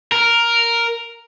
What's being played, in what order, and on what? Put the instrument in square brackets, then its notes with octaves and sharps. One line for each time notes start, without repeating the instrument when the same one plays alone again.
[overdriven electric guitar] A#4